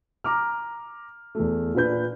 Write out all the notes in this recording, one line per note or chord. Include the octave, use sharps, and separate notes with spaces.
A#5 D6 F6
E2 A3
A#2 D4 B4 G6